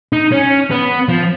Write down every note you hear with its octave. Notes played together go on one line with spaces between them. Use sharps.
D#4
C#4
B3
F3